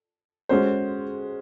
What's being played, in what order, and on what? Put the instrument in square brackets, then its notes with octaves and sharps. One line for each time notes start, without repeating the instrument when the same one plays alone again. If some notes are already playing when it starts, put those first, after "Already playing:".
[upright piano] G#3 C#4 F#4 C5